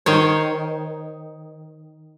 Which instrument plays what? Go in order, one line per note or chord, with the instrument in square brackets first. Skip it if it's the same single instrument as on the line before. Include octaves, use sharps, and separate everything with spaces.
[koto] D#3 C5 C#5